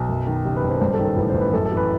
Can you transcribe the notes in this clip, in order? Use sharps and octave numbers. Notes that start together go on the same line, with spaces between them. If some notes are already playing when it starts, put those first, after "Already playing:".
Already playing: B1
F#2
D#3
F#1 G4
B4
F#1
C5
G2 C5
A4
D#3
A4
A1 B4
A1 C5
B4
F#2 A4
A4
E3
B4